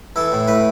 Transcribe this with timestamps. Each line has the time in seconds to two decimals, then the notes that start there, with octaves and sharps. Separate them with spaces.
0.16 E3 A4
0.32 A2
0.47 A2 B4